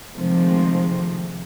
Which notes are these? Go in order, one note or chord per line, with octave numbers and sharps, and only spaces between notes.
C3 D#3 F3 G#3 A3